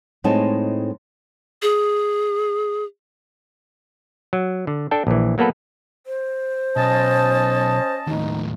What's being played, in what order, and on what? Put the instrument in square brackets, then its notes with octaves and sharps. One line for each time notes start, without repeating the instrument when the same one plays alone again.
[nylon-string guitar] A2 G#3 C4 D#4 C#5 A5
[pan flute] G#4
[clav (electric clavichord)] F#3
D3
D4 A4 G5
A#1 E3
F#3 A#3 B3 A4 B4
[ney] C5
[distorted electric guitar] B1 [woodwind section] C#4 D#5 A5
[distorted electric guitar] D#2 A2 [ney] D#4